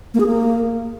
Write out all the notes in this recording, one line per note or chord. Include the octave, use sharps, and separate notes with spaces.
A#3
G#4
A#3